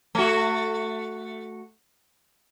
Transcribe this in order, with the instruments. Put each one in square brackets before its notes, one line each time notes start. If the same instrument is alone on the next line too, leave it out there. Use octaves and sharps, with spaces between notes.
[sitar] A3 F#4